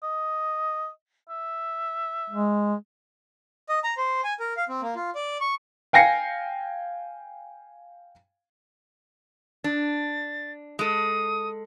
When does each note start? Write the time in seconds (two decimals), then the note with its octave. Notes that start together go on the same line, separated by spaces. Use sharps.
0.03 D#5
1.29 E5
2.30 G#3
3.69 D#5
3.84 A#5
3.97 C5
4.24 G#5
4.40 A#4
4.57 F5
4.69 C4
4.82 A#3
4.96 F4
5.15 D5
5.41 C#6
5.93 F5 G5 G#5 A#6 C7 C#7
9.64 D4 A6
10.79 G#3 A4 D#6